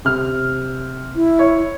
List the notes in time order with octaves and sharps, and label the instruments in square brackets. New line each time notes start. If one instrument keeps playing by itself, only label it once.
[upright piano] C3 F6
[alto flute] E4
[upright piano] C#5